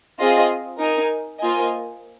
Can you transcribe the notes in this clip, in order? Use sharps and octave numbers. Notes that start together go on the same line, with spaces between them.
C4 F4 G#4 D#5
D#4 A#4 G#5
A#3 F4 C5 D#5 G#5